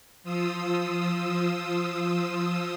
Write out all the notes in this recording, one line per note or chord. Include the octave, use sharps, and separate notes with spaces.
F3 F4 D#6 E6